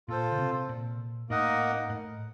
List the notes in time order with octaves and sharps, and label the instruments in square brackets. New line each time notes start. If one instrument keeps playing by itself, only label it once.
[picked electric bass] A#2 [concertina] F4 A4 C5
[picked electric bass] C#3
C3
A#2
[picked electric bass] A2 [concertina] A#3 D#4 A#4 D#5 F#5
[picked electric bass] A2